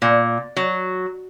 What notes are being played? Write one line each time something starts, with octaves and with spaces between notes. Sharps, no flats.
A#2
F#3